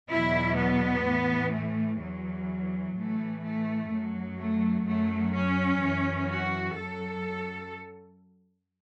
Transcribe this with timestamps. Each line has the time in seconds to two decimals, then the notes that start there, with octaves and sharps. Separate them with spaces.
0.10 E2 B2 F#3 E4
0.57 B3
1.05 A2 E3
1.53 A3
2.00 E2 E3 F#3
2.96 A2 E3 A3
3.44 A3
3.91 F#2 F#3
4.39 A3
4.86 F#2 F#3 A3
5.35 C#4
5.81 F#2 E3
6.29 F#4
6.77 F#2 F#3 A4